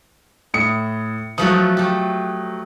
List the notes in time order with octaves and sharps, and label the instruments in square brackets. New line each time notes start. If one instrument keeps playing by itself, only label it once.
[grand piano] A2 D#6 C#7
[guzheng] F3 A3 F#4 [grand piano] F#3 D#6
[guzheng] A3 G4